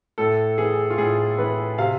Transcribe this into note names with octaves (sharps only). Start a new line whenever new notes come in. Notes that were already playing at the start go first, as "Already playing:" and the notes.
A2 A4
E3 G#4
F4
A2 G#4
E3 B4
C3 F5